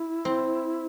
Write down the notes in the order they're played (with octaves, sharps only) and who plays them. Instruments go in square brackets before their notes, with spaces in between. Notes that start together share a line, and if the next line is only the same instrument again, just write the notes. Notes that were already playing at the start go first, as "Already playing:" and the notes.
Already playing: [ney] E4
[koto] C4